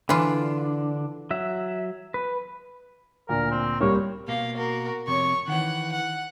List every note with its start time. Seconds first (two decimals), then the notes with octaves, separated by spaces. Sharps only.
0.09 D3 E3 D4 F4
1.31 F#3 E5
2.14 B4
3.29 D2 A#2 A#4
3.51 C4
3.80 C2 G3 A#3 C#5
4.28 B2 A#3 F5
4.56 F#4 A#4
5.08 F2 C3 C#5 C#6
5.48 D#3 E3 F#5
5.93 F#5